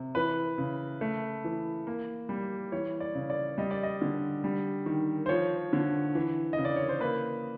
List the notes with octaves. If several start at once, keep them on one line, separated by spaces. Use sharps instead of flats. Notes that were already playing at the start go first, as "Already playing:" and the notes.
Already playing: C3
E3 B4
C#3
A3
E3
A#3
G3
E3 C#5
D5
C#3
D5
G3 D#5
D5
D#5
D3
G3
D#3
C5
F3 C#5
D3
E3
D#5
C#3
D5
C#5
C5
A#3 B4